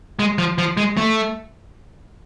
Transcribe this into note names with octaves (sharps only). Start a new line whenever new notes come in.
G#3
F3
F3
G#3
A3